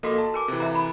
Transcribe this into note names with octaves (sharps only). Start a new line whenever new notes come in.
A#1 A#3 F#4 A4 D#5
A5
A#4 G#5 D6
C3 E3
E5 A#5
B5